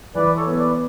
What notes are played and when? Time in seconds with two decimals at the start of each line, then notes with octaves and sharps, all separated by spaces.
0.15 E3 B4 D5
0.36 A4 C#5
0.46 B3
0.57 B4 D5